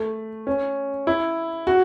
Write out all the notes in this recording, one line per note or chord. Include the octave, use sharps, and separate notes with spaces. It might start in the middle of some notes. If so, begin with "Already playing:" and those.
Already playing: A3
C#4
E4
F#4